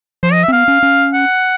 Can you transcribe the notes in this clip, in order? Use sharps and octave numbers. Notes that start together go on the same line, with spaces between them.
F3 C5
D#5
E5
C4
B3 F5
C#4
C#4
F#5